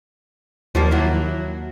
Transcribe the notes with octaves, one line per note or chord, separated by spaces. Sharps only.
D#2 F3 G3 A#3
F#3 E4